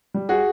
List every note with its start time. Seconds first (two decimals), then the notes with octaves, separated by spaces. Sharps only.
0.14 G3
0.29 F#4 G#4